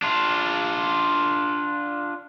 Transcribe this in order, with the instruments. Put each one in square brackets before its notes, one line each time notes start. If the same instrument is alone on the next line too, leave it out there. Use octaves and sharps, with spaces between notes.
[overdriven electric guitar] D4 F4